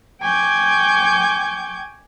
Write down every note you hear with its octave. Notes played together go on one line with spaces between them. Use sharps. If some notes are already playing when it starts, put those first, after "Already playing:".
G5 G#5 C#6 D6 G6 G#6